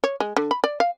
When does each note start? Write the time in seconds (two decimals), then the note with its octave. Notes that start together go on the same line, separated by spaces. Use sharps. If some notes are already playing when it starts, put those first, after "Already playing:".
0.04 C#5
0.20 G#3
0.37 D3
0.51 B5
0.64 D5
0.80 F5